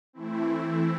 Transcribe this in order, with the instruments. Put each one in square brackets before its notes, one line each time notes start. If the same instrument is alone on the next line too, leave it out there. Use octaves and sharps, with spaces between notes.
[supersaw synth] E3 A3 C4 E4